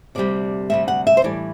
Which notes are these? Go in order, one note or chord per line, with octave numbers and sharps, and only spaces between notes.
D2 C3 G3 D5
D2 C3 G3 E5
F#5
E5
C5
A2 E3 G3 D5